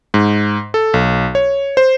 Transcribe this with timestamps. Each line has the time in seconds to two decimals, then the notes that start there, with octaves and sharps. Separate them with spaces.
0.14 G#2
0.74 A4
0.94 B1
1.35 C#5
1.77 C5